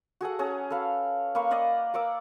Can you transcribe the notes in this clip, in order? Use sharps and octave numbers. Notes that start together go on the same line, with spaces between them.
F#4 G#4 A4 F#5
C#4 F#4 G#4 A#5
A4 B4 F5
A#3 B4 F5 C#6
D5 D#5 F5 F#5
A#4 F#5 D6 E6